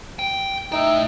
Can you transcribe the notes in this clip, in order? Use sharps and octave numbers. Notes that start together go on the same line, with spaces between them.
G5
A2 D#4 E5 G5 E6